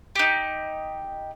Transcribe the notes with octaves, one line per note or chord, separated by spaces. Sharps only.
D#4 G4